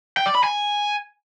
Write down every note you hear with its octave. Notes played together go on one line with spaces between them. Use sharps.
G5
D5
B5
G#5